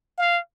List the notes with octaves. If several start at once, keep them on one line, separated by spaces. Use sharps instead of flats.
F5